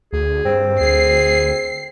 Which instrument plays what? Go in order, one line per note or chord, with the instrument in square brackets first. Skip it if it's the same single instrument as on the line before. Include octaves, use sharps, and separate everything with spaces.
[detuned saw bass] D2 [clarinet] G#4
[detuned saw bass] G2 [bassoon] C4
[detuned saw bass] D2 [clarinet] G#4 [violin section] C7